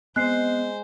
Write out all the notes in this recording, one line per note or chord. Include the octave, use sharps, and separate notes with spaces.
G#3 B3 C4 C5 F#6 C7